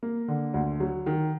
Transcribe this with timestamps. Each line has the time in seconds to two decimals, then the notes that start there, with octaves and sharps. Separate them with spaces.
0.03 A#3
0.28 D3
0.54 D2
0.80 F#3
1.06 D#3